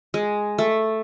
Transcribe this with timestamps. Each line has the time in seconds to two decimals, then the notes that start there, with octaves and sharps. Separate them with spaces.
0.14 G#3
0.58 A3